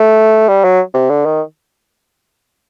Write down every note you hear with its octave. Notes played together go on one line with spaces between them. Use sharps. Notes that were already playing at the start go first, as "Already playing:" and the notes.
Already playing: A3
G3
F#3
C3
D3
D#3